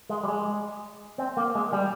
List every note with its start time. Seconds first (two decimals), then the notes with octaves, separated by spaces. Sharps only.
0.10 G#3
0.23 G3
0.28 G#3
1.18 C4
1.37 A#3
1.55 G#3
1.73 G3